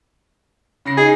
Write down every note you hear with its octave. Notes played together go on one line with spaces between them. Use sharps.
C#3 A#6 C7
D#4 G#4